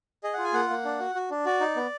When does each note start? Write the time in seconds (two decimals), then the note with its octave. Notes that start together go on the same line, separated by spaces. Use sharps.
0.24 G#4 D#5
0.33 F4 F#5
0.44 G#5
0.54 A#3 F#5
0.70 A#3
0.85 D4
1.00 F#4
1.15 F#4
1.31 D4
1.45 F#4 D5
1.61 D#4
1.76 B3